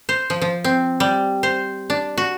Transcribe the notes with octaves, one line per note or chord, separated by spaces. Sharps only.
C5
F3
F3
C4
G3
C5
D4
F#4